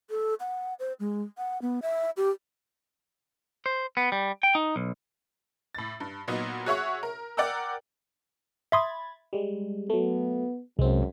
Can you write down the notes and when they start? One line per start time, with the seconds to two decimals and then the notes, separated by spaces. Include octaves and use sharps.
0.10 A4
0.40 F#5
0.79 C5
1.00 G#3
1.38 F#5
1.62 B3
1.82 E5
2.17 G4
3.66 C5
3.97 B3
4.12 G3
4.43 G5
4.55 D#4
4.76 B1
5.75 A2 A6
6.00 G2
6.28 A#2 F#3 B3 D#4
6.66 F#4 G#4 C#5 E5 F#5 C#6
7.03 A#4
7.37 A#4 D5 F#5 G5 A#5 E6
8.72 E5 B5 C6 D#6 G#6 A6
9.33 G3 G#3
9.90 F#3 A3 B3
10.79 C2 F#2 G#3 C4